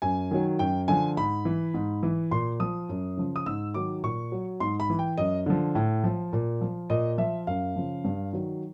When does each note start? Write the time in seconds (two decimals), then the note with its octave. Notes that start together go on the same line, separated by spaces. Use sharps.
0.02 F#2 G#5
0.31 D#3 F#3
0.59 F#2 G5
0.88 D3 F3 G#5
1.17 G#2 B5
1.45 E3
1.74 G#2
2.03 E3
2.31 A#2 C6
2.60 F3 D#6
2.89 F#2
3.17 C#3 F3
3.36 D#6
3.46 G#2 E6
3.74 D#3 F#3 D6
4.03 A#2 C#6
4.32 F#3
4.60 G#2 C6
4.80 B5
4.90 E3
4.99 G5
5.17 F#2 D#5
5.46 D3 F3
5.75 A2
6.04 F3
6.33 A#2
6.61 F3
6.90 A#2 D#5
7.18 F3 E5
7.47 F#2 F5
7.76 C#3 F3
8.04 G2
8.33 D#3 F#3